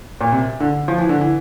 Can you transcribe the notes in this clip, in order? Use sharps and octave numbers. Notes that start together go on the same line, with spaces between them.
A#2
C3
D3
F3
E3
D3
E3